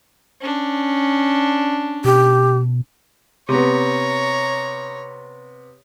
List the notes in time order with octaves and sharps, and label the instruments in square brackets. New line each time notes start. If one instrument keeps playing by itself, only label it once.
[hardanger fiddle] C#4 D4
[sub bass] B2 [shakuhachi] G4
[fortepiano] C3 B3 [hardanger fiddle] C#5 A#5